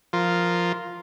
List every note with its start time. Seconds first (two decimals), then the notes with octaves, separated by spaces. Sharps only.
0.13 F3 F4 A#4